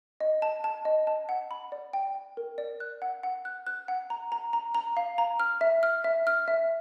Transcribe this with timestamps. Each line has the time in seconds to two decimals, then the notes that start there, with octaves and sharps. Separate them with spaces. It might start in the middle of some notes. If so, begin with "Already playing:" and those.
0.20 D#5
0.42 A5
0.64 A5
0.85 D#5
1.07 A5
1.29 F#5
1.51 B5
1.72 D5
1.93 G5
2.15 G5
2.37 A#4
2.58 D5
2.80 F#6
3.02 F#5
3.23 F#5
3.45 F#6
3.67 F#6
3.88 F#5
4.10 A#5
4.32 A#5
4.53 A#5
4.75 A#5
4.97 F5
5.18 A#5
5.40 F6
5.61 E5
5.83 F6
6.04 E5
6.27 F6
6.48 E5